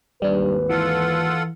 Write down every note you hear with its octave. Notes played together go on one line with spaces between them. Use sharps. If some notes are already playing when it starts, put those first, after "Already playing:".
G#1 D#2 G3 D4 B4
E3 F4 A4 F#5